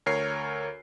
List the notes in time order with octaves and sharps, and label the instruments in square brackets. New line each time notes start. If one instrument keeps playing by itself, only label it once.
[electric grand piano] D2 A#4 C#5 C7